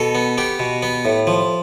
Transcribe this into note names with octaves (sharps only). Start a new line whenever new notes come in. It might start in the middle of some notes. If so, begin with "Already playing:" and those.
Already playing: B2 A4
B3
B3 G4
B2
B3
A2
F3